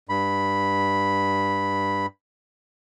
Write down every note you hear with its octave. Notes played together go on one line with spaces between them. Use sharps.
G2 B5